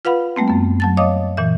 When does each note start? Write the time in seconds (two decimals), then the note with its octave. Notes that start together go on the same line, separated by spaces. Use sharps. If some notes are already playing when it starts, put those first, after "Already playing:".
0.05 F4 B4 F5 F#5 B5
0.36 G3 A3 A#3 C4
0.48 F#2 B3
0.80 F#3 A5 A6
0.97 C#5 D#5 F5 D6 D#6
1.37 A#2 E3 E5